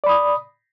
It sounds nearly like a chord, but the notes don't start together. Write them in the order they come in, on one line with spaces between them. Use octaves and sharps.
D5 B5 D#6